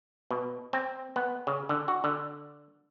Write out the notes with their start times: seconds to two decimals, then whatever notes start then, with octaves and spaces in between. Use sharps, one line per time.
0.31 B2
0.73 C4
1.16 B3
1.47 C#3
1.69 D3
1.88 F#4
2.04 D3